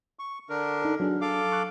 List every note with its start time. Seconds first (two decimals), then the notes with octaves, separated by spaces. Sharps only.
0.19 C#6
0.49 D3 D4 A#4
0.82 D#4 A4
1.00 F#3 D4 G#4
1.21 A4 F5 D6
1.52 C#6 F#6